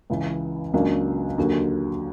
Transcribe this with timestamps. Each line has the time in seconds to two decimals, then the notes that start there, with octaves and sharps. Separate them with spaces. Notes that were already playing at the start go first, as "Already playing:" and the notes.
0.10 C#2 C#3 E3
0.74 C#2 C#3 F#3 A#3 D4
1.38 D#2 D3 F#3